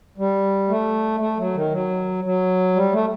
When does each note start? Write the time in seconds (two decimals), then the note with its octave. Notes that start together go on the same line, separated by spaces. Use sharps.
0.18 G3
0.69 A3
1.20 A3
1.38 F#3
1.55 D#3
1.72 F#3
2.24 F#3
2.76 G3
2.93 A3